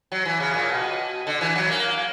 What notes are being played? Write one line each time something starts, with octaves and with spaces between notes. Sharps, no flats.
F#3
E3
C#3
A#2
B2
D3
E3
F#3
A#3